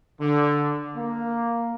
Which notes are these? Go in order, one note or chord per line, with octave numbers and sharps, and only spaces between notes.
D3
A#3